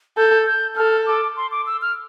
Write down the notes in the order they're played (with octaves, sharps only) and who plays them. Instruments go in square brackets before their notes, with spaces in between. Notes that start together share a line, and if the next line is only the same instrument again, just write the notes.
[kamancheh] A4 [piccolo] G6
[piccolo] G6
[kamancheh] A4 [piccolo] F6
[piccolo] D6
C6
D6
E6
F6